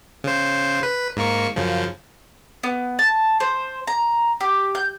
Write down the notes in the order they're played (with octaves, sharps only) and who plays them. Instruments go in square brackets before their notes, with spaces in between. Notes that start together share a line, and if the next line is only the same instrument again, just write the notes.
[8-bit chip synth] C#3 C5
B4
G#2 A#3 C#6
F#2 C#3 F3
[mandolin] B3
A5
C5
A#5
G4
G6